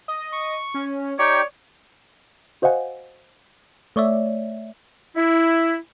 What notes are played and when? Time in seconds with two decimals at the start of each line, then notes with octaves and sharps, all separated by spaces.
0.08 D#5
0.32 C#6
0.74 C#4
1.19 D#4 G4 C#5 D5 G5
2.62 F#4 C5 D#5 F5 F#5 G#5
3.96 A3 C#5 D5 E5
5.16 E4